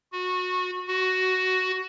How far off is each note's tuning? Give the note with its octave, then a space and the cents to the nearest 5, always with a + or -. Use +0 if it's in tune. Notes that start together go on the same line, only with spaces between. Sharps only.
F#4 -20
F#4 +10